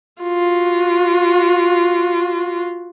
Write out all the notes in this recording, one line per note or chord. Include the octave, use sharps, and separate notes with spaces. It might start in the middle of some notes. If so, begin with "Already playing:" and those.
F4 F#4